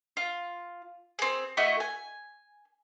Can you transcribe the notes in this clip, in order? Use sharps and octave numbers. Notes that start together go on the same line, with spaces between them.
F4
C4 G#4
A3 E4 F#4 D#5
G#5